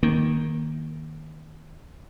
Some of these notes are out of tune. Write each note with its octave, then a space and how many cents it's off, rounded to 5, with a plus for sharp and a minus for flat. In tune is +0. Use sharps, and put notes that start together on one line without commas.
D#3 +0 A#3 +0